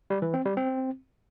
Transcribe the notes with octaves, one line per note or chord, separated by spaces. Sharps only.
G3
E3
C4
G3
C4